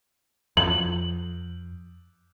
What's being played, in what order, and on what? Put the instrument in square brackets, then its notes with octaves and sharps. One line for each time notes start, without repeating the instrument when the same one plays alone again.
[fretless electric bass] F2 [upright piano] F#7